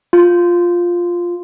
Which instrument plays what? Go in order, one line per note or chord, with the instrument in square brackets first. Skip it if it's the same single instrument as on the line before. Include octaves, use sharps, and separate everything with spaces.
[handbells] F4